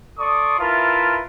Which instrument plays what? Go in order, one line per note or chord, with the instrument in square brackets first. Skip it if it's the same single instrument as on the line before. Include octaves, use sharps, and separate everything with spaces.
[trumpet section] A4 D5 C6 C#6 D#6
E4 F4 A#4 B4 E5 A5